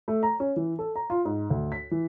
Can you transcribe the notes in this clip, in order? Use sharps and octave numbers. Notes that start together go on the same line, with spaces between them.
A3
A#5
C#4
E3
A4
A#5
F4
G#2
D2
B6
E3